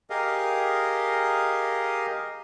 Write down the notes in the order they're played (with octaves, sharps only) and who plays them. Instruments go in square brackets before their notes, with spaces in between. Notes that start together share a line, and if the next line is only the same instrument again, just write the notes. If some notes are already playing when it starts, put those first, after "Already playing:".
[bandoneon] G4 G#4 A#4 D#5 F5